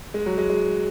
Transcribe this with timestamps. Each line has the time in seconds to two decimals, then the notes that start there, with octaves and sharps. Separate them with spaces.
0.14 G#3
0.26 F#3
0.38 G#3
0.50 G#3